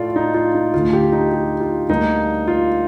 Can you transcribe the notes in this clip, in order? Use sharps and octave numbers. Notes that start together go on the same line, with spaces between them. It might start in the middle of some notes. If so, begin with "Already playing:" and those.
Already playing: A2 A3 F4 D5
D#4
F4
D#4
D2 D3 A3 F4
G4
D#4
G4
F4
D2 D3 G3 A#3 D#4
F4